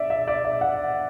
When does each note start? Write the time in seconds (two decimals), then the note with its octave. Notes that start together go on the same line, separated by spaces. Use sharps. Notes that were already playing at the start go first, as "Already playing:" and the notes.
Already playing: D5 E5
0.10 E5
0.28 D5
0.45 E5
0.61 F#5